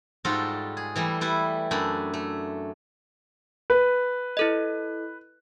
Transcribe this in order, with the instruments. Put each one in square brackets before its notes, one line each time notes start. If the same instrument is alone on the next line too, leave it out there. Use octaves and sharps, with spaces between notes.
[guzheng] G#2 G3 F4 F#4 A4
G#4
E3 G3 A3
G3 E4 B4
F#2 A3 D4 B5
A3
[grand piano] B4
[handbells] E4 A4 D#5